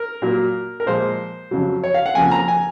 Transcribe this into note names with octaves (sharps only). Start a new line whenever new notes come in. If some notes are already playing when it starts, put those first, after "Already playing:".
Already playing: A#4
A#2 F#3 A#3
A#4
A#2 F3 G#3 C5
F2 C#3 F#3
C#5
F5
F#5
F2 C#3 F3 A#3 G#5
A#5
G#5